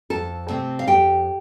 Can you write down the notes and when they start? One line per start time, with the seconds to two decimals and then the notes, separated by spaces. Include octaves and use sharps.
0.10 F2 A4 A5
0.49 C3 A3 C4
0.79 F5
0.87 F2 G4 G5